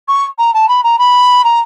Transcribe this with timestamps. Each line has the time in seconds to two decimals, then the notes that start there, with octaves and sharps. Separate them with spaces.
0.08 C#6
0.38 A#5
0.53 A5
0.68 B5
0.83 A#5
0.98 B5
1.44 A#5